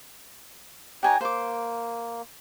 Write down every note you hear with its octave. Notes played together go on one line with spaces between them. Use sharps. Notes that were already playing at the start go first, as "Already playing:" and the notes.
D#4 G4 C#5 G#5 A#5 F#6
A#3 C5 D6